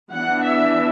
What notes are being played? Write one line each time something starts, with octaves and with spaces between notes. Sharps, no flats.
E3 B3 D4 F#5
E5